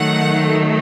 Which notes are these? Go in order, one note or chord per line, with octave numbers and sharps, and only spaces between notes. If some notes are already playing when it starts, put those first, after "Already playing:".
Already playing: D#3 F#3 A3 F#5